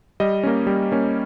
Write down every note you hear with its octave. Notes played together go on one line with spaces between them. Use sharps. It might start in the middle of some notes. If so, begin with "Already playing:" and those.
G3 D#5
A#3 C#4
G3
A#3 C#4